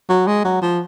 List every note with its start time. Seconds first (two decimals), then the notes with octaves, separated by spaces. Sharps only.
0.09 F#3
0.27 G#3
0.44 F#3
0.62 F3